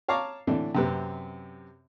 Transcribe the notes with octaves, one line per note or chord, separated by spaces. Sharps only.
C#5 F5 A5 A#5 C#6 D6
A2 D3 E3 A3 D4
F#2 C3 B4